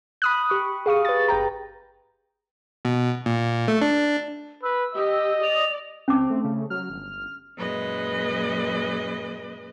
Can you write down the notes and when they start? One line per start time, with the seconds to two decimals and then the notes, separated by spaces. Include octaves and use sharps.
0.22 B5 D#6 F#6
0.50 G4 C#6
0.86 G#4 F5 C#6 D#6
1.05 B4 A6
1.28 G1 B4 G5 A#5
2.85 B2
3.26 A#2
3.68 A3
3.82 D4
4.63 B4 E6
4.95 G4 D#5
5.43 D5 F7
6.08 C#2 C4 C#4 A5 D6
6.30 A3
6.44 C#3
6.70 F#3 F6
6.90 G1
7.56 F#2 A#2 G#3 B4 D#5